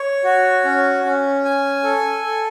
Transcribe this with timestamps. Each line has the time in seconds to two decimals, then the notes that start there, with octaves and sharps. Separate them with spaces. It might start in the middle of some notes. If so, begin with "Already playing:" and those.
Already playing: C#5
0.24 F#4
0.65 C#4
1.04 C#4
1.44 G#5
1.84 A4
2.24 A4